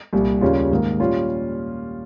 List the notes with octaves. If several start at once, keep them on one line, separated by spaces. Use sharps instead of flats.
C2 A#2 G3
D#2 C#3 G3 C#4 F4
G#2 D#3 A#3
A#2 G3 C#4 F4